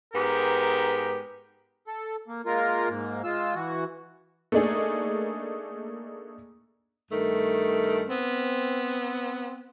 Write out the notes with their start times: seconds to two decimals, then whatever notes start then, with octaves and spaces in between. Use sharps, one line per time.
0.14 G#2 B3 G4 A#4 G5
1.87 A4
2.28 A#3
2.46 G#3 A#3 F4 A#4
2.89 G#2 A#3
3.24 G#3 F4 E6
3.55 E3 F#4
4.52 A3 A#3 D4 D#4 G#4
7.11 G2 D#3 A3
8.09 B3 C4